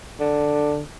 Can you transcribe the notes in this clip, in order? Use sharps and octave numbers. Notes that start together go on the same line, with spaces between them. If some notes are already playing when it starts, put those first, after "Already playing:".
D3